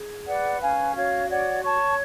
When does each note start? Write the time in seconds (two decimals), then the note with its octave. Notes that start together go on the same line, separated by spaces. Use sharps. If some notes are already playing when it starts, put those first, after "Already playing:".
Already playing: G#4
0.27 B4 D5 F#5
0.61 C#4 F5 G#5
0.95 F#4 C#5 F5
1.29 C#5 D5 F#5
1.63 C#5 A5 C#6